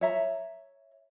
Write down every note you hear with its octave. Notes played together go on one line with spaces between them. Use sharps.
C#5 E5 A#5